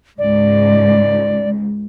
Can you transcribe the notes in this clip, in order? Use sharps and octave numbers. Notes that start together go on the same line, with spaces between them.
C#2 G#2 D5